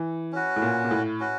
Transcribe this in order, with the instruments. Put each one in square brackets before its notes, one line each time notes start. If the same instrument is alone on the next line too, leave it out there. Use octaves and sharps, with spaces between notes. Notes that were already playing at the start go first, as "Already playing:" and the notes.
Already playing: [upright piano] E3
[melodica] C#4 F#4 B4
[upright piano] A2
A#2
A#2
A2
[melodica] C#4 F#4 B4